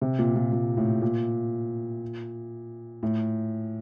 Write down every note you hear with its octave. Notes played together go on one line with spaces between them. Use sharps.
C3
A#2
A#2
A#2
A2
A#2
A2